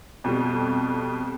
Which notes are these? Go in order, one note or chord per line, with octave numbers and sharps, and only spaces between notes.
F2 B2 G3